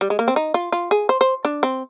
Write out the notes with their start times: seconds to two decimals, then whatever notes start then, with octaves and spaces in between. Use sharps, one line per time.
0.01 G3
0.10 G#3
0.19 A#3
0.28 C4
0.36 D#4
0.54 F4
0.72 F4
0.91 G#4
1.09 C5
1.21 C5
1.45 D4
1.63 C4